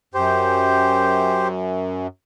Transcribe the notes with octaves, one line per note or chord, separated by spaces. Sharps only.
F#2 G4 C5